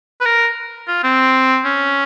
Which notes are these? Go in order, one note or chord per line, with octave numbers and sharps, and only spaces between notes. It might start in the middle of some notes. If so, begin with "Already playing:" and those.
B4
A#4
F4
C4
C#4